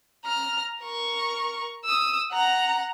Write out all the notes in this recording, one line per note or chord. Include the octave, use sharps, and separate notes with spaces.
A#5 F6
A#4 C#6
D#6 E6
F#5 A#5